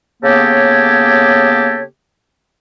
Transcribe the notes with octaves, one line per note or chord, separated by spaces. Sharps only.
C#3 A#3 B3 G4 A4 C#5